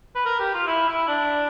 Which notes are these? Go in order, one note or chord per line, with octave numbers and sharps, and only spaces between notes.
B4
A#4
G4
F4
E4
E4
D4